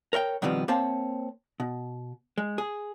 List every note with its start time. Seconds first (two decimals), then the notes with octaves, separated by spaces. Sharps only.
0.13 A#4 C#5 E5 G5
0.42 B2 D#3 F3 G3 B3 C4
0.68 A#3 C4 C5 C#5 A5
1.60 B2
2.38 G#3
2.58 G#4